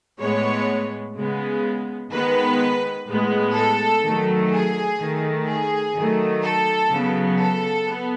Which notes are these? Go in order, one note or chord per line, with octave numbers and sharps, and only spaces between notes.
A2 G#3 B3 C#5
C#3 G#3 B3
D#3 G#3 B3 B4
A2 G#3 B3
A4
D#3 F#3 A3
G#4
D#3 A3
G#4
D#3 F#3 A3
A4
C#3 F#3 B3
A4
B3